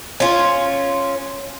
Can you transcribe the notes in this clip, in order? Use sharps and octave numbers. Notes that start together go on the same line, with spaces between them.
C#4 F4